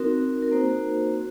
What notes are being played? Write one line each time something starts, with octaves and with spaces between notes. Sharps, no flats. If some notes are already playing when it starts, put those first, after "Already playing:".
Already playing: C4 D#4 F#4 A#4
A#4
A#3 D#4 F#4 C5
F#4